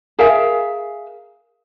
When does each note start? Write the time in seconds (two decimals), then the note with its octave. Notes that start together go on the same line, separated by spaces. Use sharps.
0.19 G#4 A#4 E5 F5